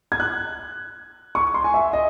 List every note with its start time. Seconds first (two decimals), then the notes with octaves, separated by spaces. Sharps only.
0.12 G#6
0.20 F#6
1.35 C#6
1.54 C6
1.64 G#5
1.74 E5
1.93 D#5